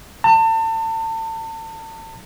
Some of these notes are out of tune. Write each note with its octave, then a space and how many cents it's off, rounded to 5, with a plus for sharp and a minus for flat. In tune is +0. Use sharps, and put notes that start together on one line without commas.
A5 +35